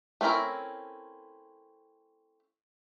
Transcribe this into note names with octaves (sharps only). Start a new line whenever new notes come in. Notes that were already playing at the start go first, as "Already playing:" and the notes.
A3 C4 C#4 E4 A#4